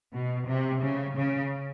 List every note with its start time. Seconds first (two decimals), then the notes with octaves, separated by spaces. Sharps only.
0.12 B2
0.46 C3
0.81 C#3
1.15 C#3